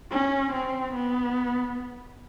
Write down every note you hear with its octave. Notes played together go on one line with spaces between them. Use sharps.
C#4
C4
B3